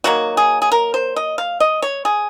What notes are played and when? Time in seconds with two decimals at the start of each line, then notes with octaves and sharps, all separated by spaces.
0.04 D#3 F#3 A#3 F#4
0.37 G#4
0.62 G#4
0.72 A#4
0.94 C5
1.16 D#5
1.38 F5
1.60 D#5
1.82 C#5
2.05 G#4